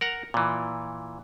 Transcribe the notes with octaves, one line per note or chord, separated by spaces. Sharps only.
A#4 F#5 A#5
A#2 E3